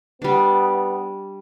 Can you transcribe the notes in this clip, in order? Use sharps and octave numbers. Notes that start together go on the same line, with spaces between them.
G3 B3 D4